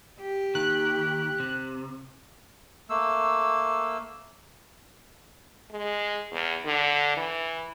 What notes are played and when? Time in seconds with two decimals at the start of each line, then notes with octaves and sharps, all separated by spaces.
0.21 G4
0.55 D#2 D#3 F#6
1.40 C3
2.90 A3 A#3 E6
5.71 G#3
6.32 E2
6.66 D3
7.17 E3